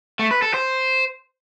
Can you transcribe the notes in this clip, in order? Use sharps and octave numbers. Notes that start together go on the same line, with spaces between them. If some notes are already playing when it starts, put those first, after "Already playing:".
A3
B4
A4
C5